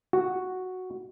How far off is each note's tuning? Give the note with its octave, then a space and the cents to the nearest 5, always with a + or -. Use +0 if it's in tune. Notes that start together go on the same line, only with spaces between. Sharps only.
F#4 +0